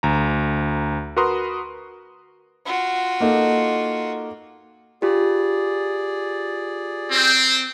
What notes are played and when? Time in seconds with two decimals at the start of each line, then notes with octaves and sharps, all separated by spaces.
0.03 D2 A#5
1.16 F#4 A#4 B4 A#5 C6 D#6
2.66 F4 F#4
3.20 A#3 D#4 A4
5.02 F4 G4 G#4 D5
7.11 C4